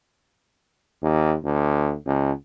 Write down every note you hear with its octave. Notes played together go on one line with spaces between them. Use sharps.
D#2
D2
C#2